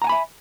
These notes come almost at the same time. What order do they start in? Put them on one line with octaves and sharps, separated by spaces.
A#5 F#5 G#5 B5 E5